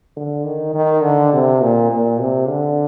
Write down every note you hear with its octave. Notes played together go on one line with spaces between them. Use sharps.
D3
D#3
D#3
D3
C3
A#2
A#2
C3
D3